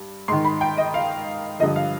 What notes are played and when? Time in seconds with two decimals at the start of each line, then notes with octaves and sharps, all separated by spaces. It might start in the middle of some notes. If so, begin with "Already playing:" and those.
Already playing: G2
0.28 G#2 D#3 C6
0.45 B5
0.61 G5
0.77 D#5
0.94 F5
1.59 G2 D3 F3 D#5
1.76 F5